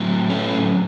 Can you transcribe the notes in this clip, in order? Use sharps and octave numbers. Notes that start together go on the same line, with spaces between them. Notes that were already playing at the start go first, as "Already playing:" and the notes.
Already playing: A2 F#3
A3 C#4